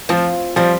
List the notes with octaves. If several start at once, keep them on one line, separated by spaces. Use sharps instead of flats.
F3 C4 F4
F3 G3 C4